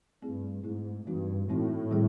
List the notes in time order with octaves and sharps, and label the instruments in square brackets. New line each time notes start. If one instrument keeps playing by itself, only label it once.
[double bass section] G2 [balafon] A3 C4 E4 G#4
[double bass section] G#2 [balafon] A3 C4 E4 G#4
[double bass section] G2 [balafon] E3 G#3 C4 D#4 F#4
[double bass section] A2 [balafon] E3 G#3 C4 D#4 F#4
[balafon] D#3 G3 C4 G#4